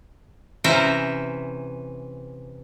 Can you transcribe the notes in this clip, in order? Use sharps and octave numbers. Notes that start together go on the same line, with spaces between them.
C3 E3 C#4 C5 E5 A#5